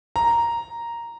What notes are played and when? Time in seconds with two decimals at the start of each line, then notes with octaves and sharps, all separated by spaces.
0.16 A#5